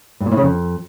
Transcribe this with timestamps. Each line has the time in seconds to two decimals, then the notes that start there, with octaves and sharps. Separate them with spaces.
0.21 G2
0.26 A#2
0.32 A2
0.37 C#3
0.43 F2